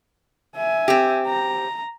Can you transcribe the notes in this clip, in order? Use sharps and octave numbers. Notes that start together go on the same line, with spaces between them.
E5 G#5
C4 G4
A#5